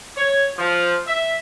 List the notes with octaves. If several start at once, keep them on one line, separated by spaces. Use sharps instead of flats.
C#5
F3
E5